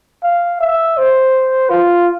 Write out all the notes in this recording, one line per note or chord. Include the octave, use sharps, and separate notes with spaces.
F5
E5
C5
F4